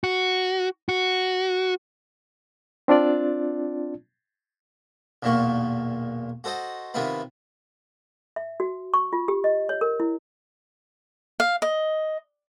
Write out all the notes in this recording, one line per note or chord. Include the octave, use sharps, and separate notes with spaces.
F#4
F#4
C4 D4 F4 D5
B1 E2 A#2 D#3 A#3 C#6
F#4 A4 C5 D#5 F#5
C3 D#3 B3 E4 F4 B4
E5
F#4
C#6
F4
G4
D#5
C#5
A#4
E4
F5
D#5